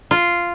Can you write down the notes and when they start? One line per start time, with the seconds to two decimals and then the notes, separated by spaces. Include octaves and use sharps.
0.11 F4